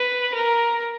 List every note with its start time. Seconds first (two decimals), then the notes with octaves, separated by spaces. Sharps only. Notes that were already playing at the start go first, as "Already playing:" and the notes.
Already playing: B4
0.34 A#4